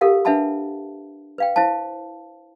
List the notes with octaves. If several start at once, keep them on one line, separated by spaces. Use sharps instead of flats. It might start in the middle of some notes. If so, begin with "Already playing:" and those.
F4 G4 A4 A#4 F5 F#5
D4 B4 E5 F#5 A5 B5
B4 F5 G5
E4 C5 F5 A5